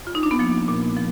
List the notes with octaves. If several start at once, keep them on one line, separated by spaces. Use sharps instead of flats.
F4
D#4
D4
B3
F3 A#3
A#2
F3